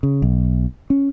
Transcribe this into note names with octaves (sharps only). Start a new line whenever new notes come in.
C#3
B1
C#4